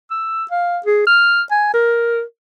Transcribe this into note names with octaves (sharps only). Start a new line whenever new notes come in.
E6
F5
G#4
F6
G#5
A#4